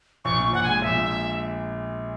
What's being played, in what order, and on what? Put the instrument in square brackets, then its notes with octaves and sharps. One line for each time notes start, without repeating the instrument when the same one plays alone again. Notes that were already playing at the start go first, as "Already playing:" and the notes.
[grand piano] A#1 [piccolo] C#6
[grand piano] A#2
[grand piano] A#1 [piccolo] F#5
[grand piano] G#3 [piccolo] G#5
[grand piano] A#1 [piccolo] E5
[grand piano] A#2